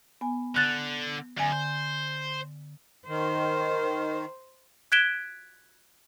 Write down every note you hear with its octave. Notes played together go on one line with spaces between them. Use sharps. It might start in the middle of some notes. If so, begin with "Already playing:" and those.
B3 G#5
D3 F#6 A6
F#2 D3 G#5
C5
D#3 C5
F#6 G#6 B6 D7 E7 G7